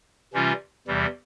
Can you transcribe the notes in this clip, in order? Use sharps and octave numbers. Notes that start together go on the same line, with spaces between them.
C3 E3 G3 C#4 F4
E2 C3 E3 G3